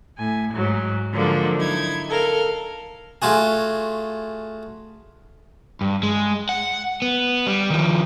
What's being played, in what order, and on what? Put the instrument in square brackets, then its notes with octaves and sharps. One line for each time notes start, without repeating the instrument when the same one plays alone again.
[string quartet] A2 G#5
G#2 F#3
D3 F3 F#3 G#3 A#3 D4
D#4 E4 G#6
A4 A#4 F5
[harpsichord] A3 F4 F#4 G#4
[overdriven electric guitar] G2
G#3
F#5
B3
G3
D#3 F3